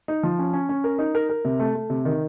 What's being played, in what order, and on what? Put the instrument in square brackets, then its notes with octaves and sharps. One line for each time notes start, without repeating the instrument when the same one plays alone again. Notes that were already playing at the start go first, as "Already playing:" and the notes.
[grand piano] D#4
F3
C#4
C#4
C#4
A#4
D#4
A#4
A#4
C3
A3
A3
C3
D#3